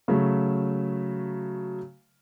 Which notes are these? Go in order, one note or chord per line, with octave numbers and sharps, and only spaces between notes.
C#3 F#3 A3 F#4